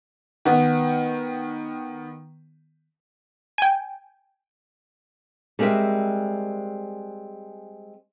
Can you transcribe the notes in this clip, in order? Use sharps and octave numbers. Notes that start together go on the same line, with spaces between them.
D#3 B3
G5 G#5
G3 G#3 C4 A#4 E5